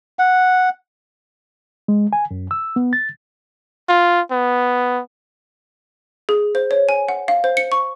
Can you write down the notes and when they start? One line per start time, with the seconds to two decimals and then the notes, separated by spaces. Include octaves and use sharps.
0.19 F#5
1.88 G#3
2.13 G#5
2.31 F#2
2.51 E6
2.76 B3
2.93 A6
3.89 F4
4.31 B3
6.29 G#4
6.55 C5
6.71 C#5
6.89 G#5
7.09 F#5
7.28 F5
7.44 C5
7.57 C#7
7.72 C#6